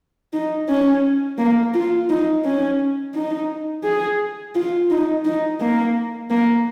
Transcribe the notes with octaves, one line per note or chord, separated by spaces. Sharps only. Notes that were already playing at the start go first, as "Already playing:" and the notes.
D#4
C#4
A#3
F4
D#4
C#4
D#4
G#4
F4
D#4
D#4
A#3
A#3